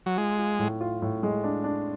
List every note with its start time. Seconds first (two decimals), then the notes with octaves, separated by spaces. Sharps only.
0.06 F#3
0.17 G#3 F4
0.39 F4
0.59 A2
0.81 F4
1.02 A2
1.23 G#3
1.44 D4
1.64 D4